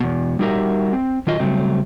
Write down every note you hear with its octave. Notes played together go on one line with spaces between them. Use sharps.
E2 B2
G3 D#4 F#4 G4 A#4 E5
C4
D#3 F#3 F4 D#5
C#3 F#3 G3 A3 C4